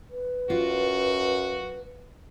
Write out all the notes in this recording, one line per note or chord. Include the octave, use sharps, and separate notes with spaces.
B4
F#2 F4 F#4